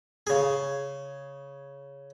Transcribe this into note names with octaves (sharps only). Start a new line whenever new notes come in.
C#3 G#4